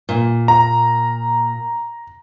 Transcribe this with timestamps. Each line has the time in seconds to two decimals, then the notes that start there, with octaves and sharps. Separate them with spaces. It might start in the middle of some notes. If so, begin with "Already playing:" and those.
0.09 A#2
0.48 A#5